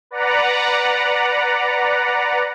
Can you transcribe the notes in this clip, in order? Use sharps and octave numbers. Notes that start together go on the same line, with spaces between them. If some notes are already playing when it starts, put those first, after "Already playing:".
B4 D5 F#5 A#5